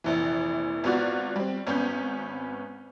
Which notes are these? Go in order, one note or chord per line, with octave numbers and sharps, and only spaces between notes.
F1 A#1 E3
G#1 B3 F4 F#4 D5
G3 C4
G#1 B3 C#4 G6